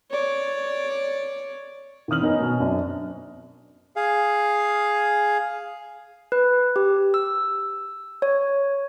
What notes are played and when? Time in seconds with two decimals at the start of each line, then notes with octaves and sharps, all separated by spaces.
0.11 C#5 D5
2.08 D#3 E3 C4 D#6 F6 F#7
2.21 B3 C#4 D#4 A#4 D#5 G#5
2.40 B2 G#5
2.60 F#2 C4 D4
3.96 G#4 F5
6.32 B4
6.76 G4
7.14 E6
8.22 C#5